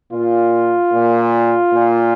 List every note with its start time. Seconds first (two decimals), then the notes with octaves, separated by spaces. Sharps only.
0.11 A#2 F4
0.91 A#2
1.72 A#2